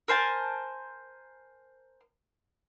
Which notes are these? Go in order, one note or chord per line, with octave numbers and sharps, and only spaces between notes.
A#4 C5 G#5 A5